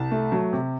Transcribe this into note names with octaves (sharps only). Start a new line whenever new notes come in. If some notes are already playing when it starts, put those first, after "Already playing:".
Already playing: C2 A5
A3
F#3
C3